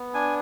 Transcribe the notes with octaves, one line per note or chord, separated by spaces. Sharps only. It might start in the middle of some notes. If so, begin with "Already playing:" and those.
Already playing: B3
D4 G#5